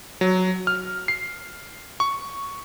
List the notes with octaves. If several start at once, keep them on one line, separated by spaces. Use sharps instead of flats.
F#3
F6
C7
C#6